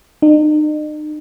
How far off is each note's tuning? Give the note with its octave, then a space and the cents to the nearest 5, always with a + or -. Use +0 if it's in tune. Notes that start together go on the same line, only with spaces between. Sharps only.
D#4 -40